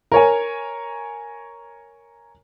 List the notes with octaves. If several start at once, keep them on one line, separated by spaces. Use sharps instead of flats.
A#4 C#5 G#5